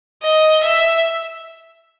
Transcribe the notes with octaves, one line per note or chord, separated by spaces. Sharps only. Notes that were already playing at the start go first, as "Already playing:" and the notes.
D#5
E5